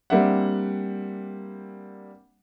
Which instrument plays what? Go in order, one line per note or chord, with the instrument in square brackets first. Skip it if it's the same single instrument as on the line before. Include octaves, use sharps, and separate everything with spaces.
[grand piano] G3 A#3 C4 D4 E5 F#5